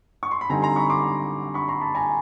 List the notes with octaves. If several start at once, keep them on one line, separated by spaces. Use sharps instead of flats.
C#6
C6
B5
D3 G3 C4 D#4 G#5 A#5
A#5 C6
B5 C#6
C6 D6
B5 C#6
A#5 C6
A5 B5
G#5 A#5